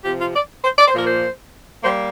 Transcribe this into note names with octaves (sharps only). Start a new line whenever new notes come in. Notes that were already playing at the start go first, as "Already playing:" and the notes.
C3 F3 C4 G4
F4
D5
C5
D5
C5
A#2 F3 A#3 A#4
C5
G3 A#3 C5